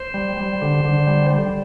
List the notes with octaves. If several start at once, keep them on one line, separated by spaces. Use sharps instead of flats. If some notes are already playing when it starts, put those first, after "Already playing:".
Already playing: C5
G3
G3
D3
D3
G3
G3